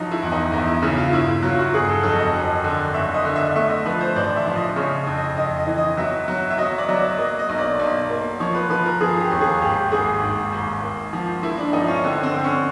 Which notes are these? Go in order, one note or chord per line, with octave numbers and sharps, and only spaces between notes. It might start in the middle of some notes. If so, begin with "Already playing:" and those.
Already playing: F3 F#3 D#4
E4
E2
D#4
E2 D#4
E4
C#3 E4
F4
G1 E4
E4
F#3 F4
F#4
G1 G#4
A4
F2 A4
D#5
F#2
D3
F#1 E5
D#5
D3
E5
A3 E5
D#5
F3 B4
C5
A1 D5
E5
F3
D#5
C#3 C#5
F2
D#5
F2 D#5
D#5
E3
D#5
F#3 E5
F#3
E5
F#3 D#5
D5
F#3
D5
A#3 D#5
D#5
B1
D5
B1
A#3
F3 C#5
B4
F3 B4
A#4
F3 G#4
G4
D#2
G#4
G#1 G4
G#1 G#4
G#2
G#1
A#3
F3
A#3 E4
D4
F3 D#4
C#4
D3 C4
C4
D3
C#4